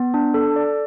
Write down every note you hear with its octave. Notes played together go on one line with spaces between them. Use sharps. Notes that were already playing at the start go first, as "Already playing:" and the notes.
Already playing: B3
D4
A4
D5